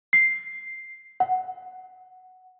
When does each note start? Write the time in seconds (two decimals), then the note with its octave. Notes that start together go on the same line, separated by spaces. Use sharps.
0.13 C7
1.20 F#5